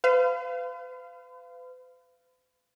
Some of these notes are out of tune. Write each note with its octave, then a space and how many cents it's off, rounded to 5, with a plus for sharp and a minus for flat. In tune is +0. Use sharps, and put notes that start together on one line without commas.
B4 +45 F5 -15